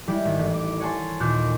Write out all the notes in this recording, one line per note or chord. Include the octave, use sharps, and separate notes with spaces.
G3 G#3 E4 G4
G#1
A1
D6
C#5 F#5 G#5 A5 C6 C#6
D#2 A#2 D6 F#6 G6